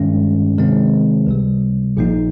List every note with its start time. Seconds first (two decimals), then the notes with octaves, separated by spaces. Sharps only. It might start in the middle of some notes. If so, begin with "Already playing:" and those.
Already playing: G2 D#3 G#3 C#4
0.58 C3 D#3 G#3 C4
1.27 C#2 C3 G3
1.97 A#1 A#2 F3 A#3 D#4